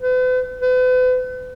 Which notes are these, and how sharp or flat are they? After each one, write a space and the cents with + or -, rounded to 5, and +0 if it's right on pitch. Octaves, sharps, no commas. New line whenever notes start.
B4 +45
B4 +40